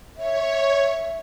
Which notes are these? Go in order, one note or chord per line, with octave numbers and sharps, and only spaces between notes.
C#5 E5